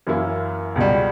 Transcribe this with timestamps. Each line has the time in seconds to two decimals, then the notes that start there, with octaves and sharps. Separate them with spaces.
0.07 F#2 E3 A#3 E4
0.76 C#2 B2 G3